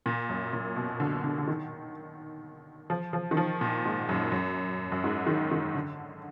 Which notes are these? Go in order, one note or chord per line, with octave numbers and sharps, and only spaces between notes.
A#2
F#2
A#2
B2
D3
D3
D3
D#3
F3
F3
D#3
F3
A#2
G#2
F#2
F#2
F#2
G#2
D#3
D#3
D3